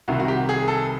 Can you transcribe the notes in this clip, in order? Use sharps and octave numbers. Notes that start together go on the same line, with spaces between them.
C2 C3 D#3 F#4
F#4
G4
G#4
A4